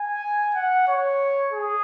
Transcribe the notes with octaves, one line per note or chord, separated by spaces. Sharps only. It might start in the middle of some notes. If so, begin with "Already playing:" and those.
Already playing: G#5
F#5
C#5
G#4